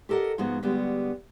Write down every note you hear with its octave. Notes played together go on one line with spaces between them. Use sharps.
G4 A4 A#4 D#5 F#5
G#2 F3 G#3 B3 F#4
D3 G3 G#3 B3 F#4 G4